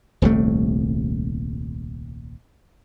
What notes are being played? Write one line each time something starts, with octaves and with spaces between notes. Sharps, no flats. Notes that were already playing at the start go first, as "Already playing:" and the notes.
D#1 C2 C3 A3